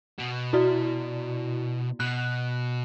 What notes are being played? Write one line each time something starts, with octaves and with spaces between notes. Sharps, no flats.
B2
E4 F#4 D5
B2 F#6